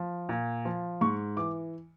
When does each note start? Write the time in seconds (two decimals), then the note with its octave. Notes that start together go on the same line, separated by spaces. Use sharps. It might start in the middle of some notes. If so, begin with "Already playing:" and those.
Already playing: F3
0.29 A#2
0.65 F3
1.01 G#2 C#6
1.36 E3 D6